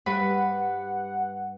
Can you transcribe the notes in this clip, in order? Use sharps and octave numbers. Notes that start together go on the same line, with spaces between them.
G2 B4 F#5 B5